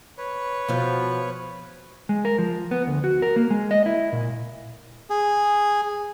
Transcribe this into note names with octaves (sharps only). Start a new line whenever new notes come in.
B4 C#5
B2 F3
G#3
A#4
F3
B3
D2
F#4
A#4
A#3
G#3
D#5
E4
A#2
G#4